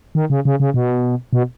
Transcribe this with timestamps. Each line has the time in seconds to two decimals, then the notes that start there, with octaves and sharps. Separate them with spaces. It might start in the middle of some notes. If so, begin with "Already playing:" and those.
0.15 D#3
0.30 C#3
0.45 C#3
0.60 C#3
0.74 B2
1.33 B2